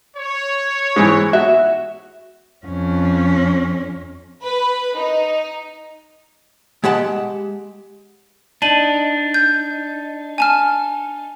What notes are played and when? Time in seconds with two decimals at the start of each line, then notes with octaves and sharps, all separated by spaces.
0.17 C#5
0.96 G#2 E3
1.33 F#4 E5
2.66 F2 C#4
4.42 B4
4.96 D#4
6.84 G#3 G4 F#5 A5
8.62 D4 D#4 A5 D#7 F#7
9.34 G6
10.38 G#5 A5 F6